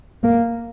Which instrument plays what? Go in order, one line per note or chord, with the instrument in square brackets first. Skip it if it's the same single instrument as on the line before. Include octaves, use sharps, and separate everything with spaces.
[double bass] A#3